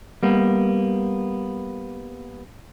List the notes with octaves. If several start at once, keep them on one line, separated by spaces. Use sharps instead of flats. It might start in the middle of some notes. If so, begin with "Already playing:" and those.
G3 A#3 B3